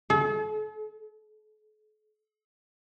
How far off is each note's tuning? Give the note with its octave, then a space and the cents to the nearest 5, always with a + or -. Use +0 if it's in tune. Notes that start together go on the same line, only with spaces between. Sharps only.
A4 -45